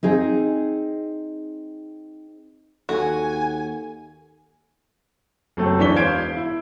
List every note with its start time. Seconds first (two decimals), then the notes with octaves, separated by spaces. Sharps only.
0.03 C4 D#4 G#4
2.89 D#2 F#4 A4 G#5
5.57 F#1 F#3 A3 C4 A4
5.78 D1 E3 D4 C#6 B6 G7
5.96 E1 C5 F5 G#6 D7
6.36 E4